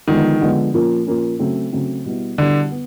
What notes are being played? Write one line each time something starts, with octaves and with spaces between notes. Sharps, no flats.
D3 D#3 F3 G#3 B3
D3 F3 G#3 B3
A#2 F3 A#3 C#4
A#2 F3 A#3 C#4
C#3 F#3 A3 C4
C#3 F#3 A3 C4
B2 G3 B3 E4
B2 D3 G3 B3 E4
B3